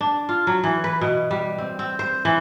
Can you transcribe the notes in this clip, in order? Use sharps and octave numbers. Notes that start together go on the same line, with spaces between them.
D4
F4
F#3
E3
B4
B2
G3
C4
C4
C5
E3